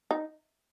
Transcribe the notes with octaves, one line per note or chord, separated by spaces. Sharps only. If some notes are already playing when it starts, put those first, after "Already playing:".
D#4